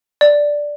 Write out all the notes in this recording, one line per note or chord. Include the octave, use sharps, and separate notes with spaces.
D5